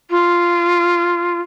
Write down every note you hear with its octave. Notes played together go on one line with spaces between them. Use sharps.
F4